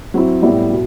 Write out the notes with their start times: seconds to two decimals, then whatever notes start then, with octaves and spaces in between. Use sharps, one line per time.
0.14 F#3 C4 E4
0.42 A2 G3 B3 E4
0.71 B2